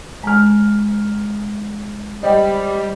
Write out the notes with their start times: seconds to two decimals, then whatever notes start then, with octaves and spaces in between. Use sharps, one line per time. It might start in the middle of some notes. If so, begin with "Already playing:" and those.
0.23 G#3 A#5 F6
2.23 G3 C5 D#5 G5